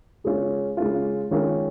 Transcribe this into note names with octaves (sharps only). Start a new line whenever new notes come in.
C#3 G#3 C#4 F4
C#3 G#3 C#4 F4
D#3 G#3 C#4 F4 A#4